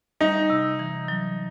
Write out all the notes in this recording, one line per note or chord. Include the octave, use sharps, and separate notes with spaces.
G3 D#4
C3
E3
F#3